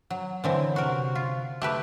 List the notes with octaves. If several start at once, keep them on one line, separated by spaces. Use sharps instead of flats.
F#3
D3 E3 C4 A#4 C5 C#5
C3 F#4 A#4 C5 C#6
F4
A3 G4 B4 D6